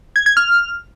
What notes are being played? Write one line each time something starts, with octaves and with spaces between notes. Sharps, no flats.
G#6
G#6
F6